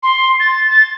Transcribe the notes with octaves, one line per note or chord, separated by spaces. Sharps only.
C6
A6
A6